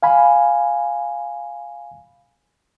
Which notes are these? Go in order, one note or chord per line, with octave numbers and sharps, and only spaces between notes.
F5 G#5 B5